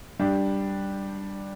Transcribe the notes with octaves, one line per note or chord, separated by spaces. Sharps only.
G3 D4 G4